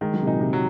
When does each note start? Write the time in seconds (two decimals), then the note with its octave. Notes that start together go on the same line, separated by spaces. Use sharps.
0.01 D#3 G#3
0.14 F#3
0.22 C3
0.27 A#2 D#4
0.41 C3
0.53 F#3